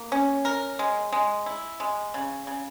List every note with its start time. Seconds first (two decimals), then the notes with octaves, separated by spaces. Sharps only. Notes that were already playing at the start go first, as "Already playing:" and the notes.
Already playing: A#3
0.12 C#4
0.45 A#4
0.79 G#3
1.13 G#3
1.46 E4
1.80 G#3
2.14 C#3
2.47 C#3